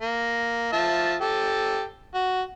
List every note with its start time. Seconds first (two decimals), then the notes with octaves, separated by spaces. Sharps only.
0.01 A#3
0.73 F3 E5 A5
1.21 G4 A4
2.14 F#4